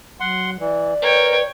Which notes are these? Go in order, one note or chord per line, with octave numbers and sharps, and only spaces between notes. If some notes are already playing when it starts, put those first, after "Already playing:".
F#3 F#5 C6
E3 D5
A#4 B4 C#5 G5